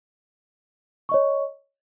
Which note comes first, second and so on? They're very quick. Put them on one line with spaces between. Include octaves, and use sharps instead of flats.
C#6 D#5 C#5